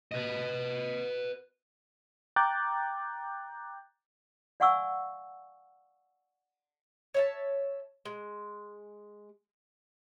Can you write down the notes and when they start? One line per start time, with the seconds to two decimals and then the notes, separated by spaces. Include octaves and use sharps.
0.12 B4 D#5
2.36 G5 A#5 D6 F#6 G6 A6
4.60 D5 F5 F#5 G#5 C#6 E6
7.14 C#5 E5 A5
8.05 G#3